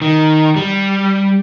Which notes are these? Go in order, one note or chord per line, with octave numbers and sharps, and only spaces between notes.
D#3
G3